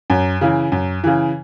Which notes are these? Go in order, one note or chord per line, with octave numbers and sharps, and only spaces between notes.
F#2
C#3 E3
F#2
C#3 E3